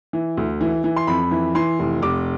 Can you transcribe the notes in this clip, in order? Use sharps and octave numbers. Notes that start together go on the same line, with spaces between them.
E3
D2
E3
E3
C6
F2 B5
E3
E3 C6
F1
F1 D6